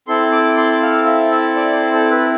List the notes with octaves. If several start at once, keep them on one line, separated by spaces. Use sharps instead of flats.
C4 E4 A4 C6
D6
C6
F5
E5
E5
D5
C5
A4
B4